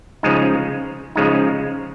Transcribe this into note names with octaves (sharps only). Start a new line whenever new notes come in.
C#3 F3 G#3 D#4
C#3 F3 G#3 D#4